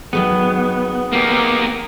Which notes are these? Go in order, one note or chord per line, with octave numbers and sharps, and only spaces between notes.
D#3 F#3 G#3 B3
A#3 G4